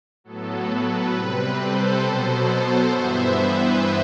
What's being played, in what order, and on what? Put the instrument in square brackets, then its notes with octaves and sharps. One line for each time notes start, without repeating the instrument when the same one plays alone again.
[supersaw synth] A2 F#3 B3 A4
B4
C3 G3 C4 B4
A4 C5
B2 F#3 B3
A4 C5
G2 E3 B3 C5 E5
B4